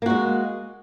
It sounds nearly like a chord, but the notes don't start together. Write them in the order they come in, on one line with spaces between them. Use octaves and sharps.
A#3 F#4 G#3